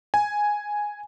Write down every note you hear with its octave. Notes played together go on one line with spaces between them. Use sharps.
G#5